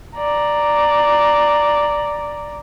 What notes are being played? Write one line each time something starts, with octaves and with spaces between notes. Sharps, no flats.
D5 A#5